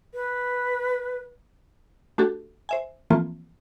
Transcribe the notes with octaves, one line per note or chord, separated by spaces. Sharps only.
B4
A3 D4 F#4 G4 A4
C5 E5 G#5
E3 F3 A3 A#3 C4 F4